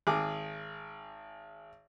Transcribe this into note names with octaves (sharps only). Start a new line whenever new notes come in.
G#1 G#4 D6